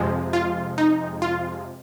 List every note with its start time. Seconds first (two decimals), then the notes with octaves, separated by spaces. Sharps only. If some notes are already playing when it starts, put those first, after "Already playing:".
Already playing: F2 C3 F3 G#3
0.33 F4
0.78 D#4
1.22 F4